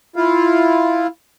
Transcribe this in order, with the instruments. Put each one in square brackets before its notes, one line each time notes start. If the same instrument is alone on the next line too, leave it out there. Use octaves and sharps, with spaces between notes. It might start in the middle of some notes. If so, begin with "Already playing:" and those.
[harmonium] E4 F4 F5